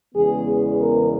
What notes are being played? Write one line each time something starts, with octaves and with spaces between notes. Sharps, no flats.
E2 C#3 E3 G#3 B3 G#4
A#4